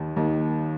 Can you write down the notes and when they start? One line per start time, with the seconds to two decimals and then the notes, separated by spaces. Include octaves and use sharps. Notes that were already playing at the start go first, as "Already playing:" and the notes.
Already playing: D#2 D#3
0.16 D#2 D#3